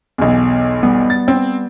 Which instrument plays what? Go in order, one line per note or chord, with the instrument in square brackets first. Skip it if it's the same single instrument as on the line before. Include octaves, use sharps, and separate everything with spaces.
[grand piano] B1 E2
[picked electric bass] G3 B3
[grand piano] A6
C4